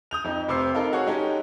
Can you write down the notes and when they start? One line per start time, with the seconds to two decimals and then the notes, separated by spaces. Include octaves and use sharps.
0.11 D#6 G6 F7
0.24 F2 D#4
0.48 F1 C3 C5 D6 E6 C7
0.74 D#4 A4 A#4 F5
0.93 F#4 G#4 C#5 C#6
1.06 G#3 C#4 D#4 G4 A4